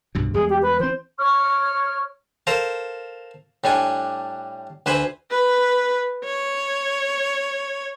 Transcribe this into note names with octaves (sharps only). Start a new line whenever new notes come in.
C2 G2 B2
E2 G3 G#3 G#4
G4
B4
E3 C4 C5
C#5 C#6 F6
A4 A#4 C5 F5 A#5
A2 G3 D4 G#5
D2 B4 C5 G#5 B5
B4
C#5